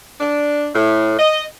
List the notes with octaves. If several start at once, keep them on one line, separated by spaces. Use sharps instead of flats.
D4
A2
D#5